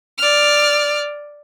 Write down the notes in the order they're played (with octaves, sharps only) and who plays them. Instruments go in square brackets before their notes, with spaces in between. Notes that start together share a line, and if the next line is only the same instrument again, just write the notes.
[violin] D5 F6